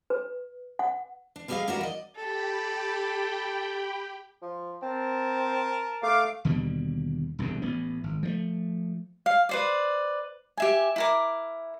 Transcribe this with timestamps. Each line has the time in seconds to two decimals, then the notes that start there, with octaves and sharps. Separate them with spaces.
0.10 B4
0.79 F#5
1.36 D4
1.48 G3 A3 G4 G#4 D#5 F5
1.68 A#3 D4 E4 F#4 G4 A#4
1.81 D5 D#5
2.16 G4 A4 G5 B5
4.42 F3
4.82 C4 A#4 A5
6.03 A3 F5 D6
6.45 D#2 B2 D3 G3
7.39 E1 C2 F#2 D3
7.62 A1 B3
8.04 G#1
8.23 F3 F#3 A3
9.26 F5
9.49 B4 C5 D5
10.58 G4 E5 G#5
10.96 E4 A#4 D6